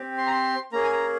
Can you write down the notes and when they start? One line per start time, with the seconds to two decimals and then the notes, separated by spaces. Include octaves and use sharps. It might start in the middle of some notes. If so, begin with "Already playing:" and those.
Already playing: C4 G4
0.18 C6
0.26 A#5
0.31 C6
0.72 A#3 C#4 G#4 A#5
0.84 G#5
0.92 A#5